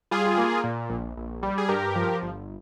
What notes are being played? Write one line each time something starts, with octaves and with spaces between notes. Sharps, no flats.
G3 F4 G#4
A#3
A#2
A#1
A#1
G3
G#4
G2 G4 A#4
F3
G1